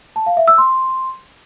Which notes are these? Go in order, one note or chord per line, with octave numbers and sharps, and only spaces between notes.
A5
F5
E5
E6
C6